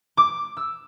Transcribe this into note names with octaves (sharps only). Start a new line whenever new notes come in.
D6
E6